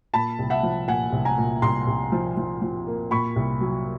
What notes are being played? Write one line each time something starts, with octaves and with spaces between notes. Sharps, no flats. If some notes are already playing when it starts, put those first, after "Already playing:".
A#2 A5 B5
C2
E5 F#5
F3
A#2 F#5 G#5
C2
G#5 A#5
A#2
C2 A#5 C6
C2
F3
F3
F3
A#3
A#2 B5 C#6
C2
F#3